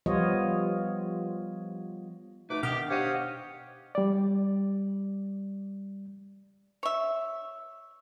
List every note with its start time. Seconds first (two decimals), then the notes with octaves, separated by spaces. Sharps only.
0.06 F3 G3 B3 F4 C#5 D#5
2.50 B2 A3 D#4 B4 D6
2.63 B2 D#3 B3 D4 G4 F6
2.90 G4 C5 C#5 D#5 F5 F#5
3.95 G3 D5
6.83 C#5 E5